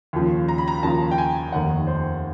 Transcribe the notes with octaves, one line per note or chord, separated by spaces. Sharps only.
D#2 C#3 F3
A#5
B5
A#5
D#2 C#3 F3 A5
G5
G#5
F1 D#2 D#3 F#5
C5